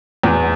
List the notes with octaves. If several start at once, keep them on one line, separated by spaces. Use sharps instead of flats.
E2